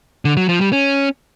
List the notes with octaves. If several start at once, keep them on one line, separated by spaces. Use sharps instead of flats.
D3
F#3
F3
G3
C#4